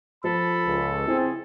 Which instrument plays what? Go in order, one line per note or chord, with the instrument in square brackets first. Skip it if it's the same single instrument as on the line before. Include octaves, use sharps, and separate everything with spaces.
[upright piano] F3 [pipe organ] A4 [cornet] B5
[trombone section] C#2
[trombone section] C4 [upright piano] E4 [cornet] G#4